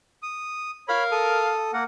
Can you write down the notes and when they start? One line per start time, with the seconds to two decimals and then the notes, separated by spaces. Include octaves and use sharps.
0.23 D#6
0.88 A#4 C#5 F5 B5
1.12 A4 D#6
1.73 A#3 A#4 F#5